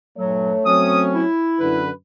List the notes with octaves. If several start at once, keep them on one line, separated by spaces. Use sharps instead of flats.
G2 A#2 F#3 A3 C#5
F#3 C4 C#4 D#6
E4
F#2 D3 B4